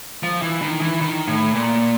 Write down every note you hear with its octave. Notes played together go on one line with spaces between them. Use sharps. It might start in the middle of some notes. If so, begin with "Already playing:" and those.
F3
E3
D#3
E3
D#3
A2
A#2